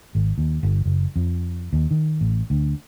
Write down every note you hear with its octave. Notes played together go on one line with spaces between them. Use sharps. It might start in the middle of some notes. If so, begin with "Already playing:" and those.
G#1
D#2
G1
F#1
F2
D#2
D#3
A1
D2